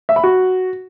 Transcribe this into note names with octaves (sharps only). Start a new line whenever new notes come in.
E5
B5
F#4